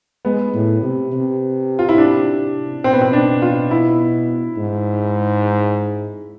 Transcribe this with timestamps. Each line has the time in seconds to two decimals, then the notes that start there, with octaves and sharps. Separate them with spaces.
0.25 G#3 B3
0.54 A2
0.82 C3
1.12 C3
1.79 F4
1.89 E4
1.98 D4
2.84 B2 C4
2.93 B3
3.02 C4
3.13 D4
3.42 F4
3.71 E4
4.57 G#2